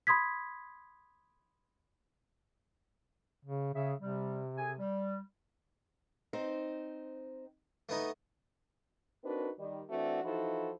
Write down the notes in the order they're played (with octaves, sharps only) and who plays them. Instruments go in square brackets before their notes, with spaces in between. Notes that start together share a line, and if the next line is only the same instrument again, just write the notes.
[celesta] B5 C6 D#6 G#6 B6
[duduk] C#3
[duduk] C#3 [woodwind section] G#4 E5
[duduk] C3 [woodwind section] G3
[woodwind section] G#4 A4 G#5
G3
[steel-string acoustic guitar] C4 D#4 C5
[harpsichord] A3 B3 D#4
[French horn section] C4 D4 D#4 F#4 A#4 B4
D#3 G3
E3 A3 C4 D4 F#4
E3 F3 D#4 E4 F#4 A4